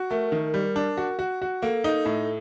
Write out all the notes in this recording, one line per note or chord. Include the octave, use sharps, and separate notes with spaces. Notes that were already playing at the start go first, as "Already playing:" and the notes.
Already playing: F#4
A3 A#4
D#3
G3
D4
F#4
F#4
F#4
A#3 A4
D#4
A2